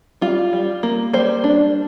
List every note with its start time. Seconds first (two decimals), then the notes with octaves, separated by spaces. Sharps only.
0.21 G3 F4
0.53 G3
0.83 A#3
1.13 G3 C5
1.44 D4